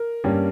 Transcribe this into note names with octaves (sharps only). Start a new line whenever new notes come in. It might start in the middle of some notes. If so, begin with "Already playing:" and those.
Already playing: A#4
G2 G3 A#3 C#4